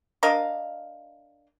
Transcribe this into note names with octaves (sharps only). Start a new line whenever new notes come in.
D4 A#4 D#5 F5